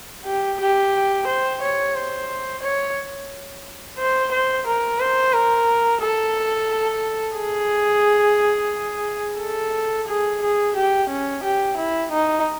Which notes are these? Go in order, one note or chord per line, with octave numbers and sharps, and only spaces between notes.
G4
G4
C5
C#5
C5
C#5
C5
C5
A#4
C5
A#4
A4
G#4
A4
G#4
G#4
G4
C#4
G4
E4
D#4